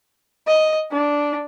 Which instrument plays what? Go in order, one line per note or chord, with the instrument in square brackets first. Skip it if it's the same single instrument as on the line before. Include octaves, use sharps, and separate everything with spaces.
[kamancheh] D#5
D4